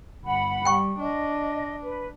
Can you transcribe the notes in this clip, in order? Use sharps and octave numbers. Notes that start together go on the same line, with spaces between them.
G1 F#5 B5
G3 G5 C#6
D4 D#5
B4